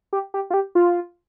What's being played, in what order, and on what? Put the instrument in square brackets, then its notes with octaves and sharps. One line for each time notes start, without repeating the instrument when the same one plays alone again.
[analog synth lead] G4
G4
F4
G4
F4